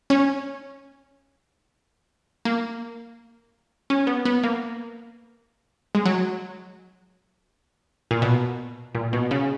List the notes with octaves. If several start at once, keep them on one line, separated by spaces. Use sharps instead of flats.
C#4
A#3
C#4
B3
B3
A#3
G#3
F#3
A#2
B2
A#2
B2
C#3